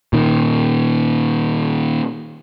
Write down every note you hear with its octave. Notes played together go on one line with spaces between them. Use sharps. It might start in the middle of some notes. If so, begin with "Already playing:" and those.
A#2 D#3